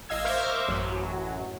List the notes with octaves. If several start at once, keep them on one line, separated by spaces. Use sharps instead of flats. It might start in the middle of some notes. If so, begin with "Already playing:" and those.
A1 D#5 F5 E6 G#6
A#4 C5 E5 F5 C#6 D6
A1 F#2 F#3